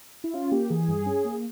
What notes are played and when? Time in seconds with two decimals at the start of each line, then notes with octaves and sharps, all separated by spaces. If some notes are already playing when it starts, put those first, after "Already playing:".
0.24 E4
0.34 C#4 F4
0.52 A#3 G4
0.70 E3 G#4
0.88 G2
1.06 C#4
1.24 A#3